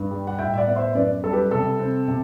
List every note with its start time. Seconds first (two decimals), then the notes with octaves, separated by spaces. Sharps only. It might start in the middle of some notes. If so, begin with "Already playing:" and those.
Already playing: G2
0.11 G3
0.27 F#5
0.39 A2 E5 G5
0.54 E5
0.58 D5 F#5
0.67 B3
0.76 C5 E5
0.95 F#2 B4 D5
1.23 G3 A4
1.33 G4 B4
1.51 C3 A4
1.79 C4
2.08 C3